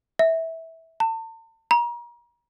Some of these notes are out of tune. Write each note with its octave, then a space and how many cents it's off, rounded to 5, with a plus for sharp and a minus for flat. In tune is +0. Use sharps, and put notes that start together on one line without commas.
E5 -15
A5 +40
A#5 +35